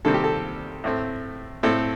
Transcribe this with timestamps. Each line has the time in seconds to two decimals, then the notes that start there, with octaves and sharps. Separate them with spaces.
0.05 C3 D#3 G3 C4 A4
0.14 G4
0.24 A4
0.84 A2 A3 C4
1.63 A2 A3 C4 A4